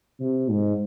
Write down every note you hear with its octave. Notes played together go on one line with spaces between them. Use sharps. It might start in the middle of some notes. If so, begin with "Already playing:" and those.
C3
G#2